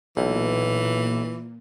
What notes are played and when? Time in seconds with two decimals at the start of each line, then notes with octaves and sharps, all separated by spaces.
0.17 B1 A#2 E3